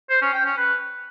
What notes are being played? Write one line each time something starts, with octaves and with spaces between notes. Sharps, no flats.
C5
C#4
G5
C#4
B4